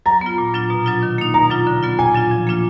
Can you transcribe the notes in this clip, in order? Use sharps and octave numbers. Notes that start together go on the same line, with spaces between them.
F#3 A#5
B3 F4
A#2
F#3 D4 F4
B2
F#3 D4 F4
D#3
A#3 D#4
B2 A#5
F#3 D4 F4
D3
F#3 B3 F4
A#2 G#5
F#3 D4 F4
F3
A#3 D4 F4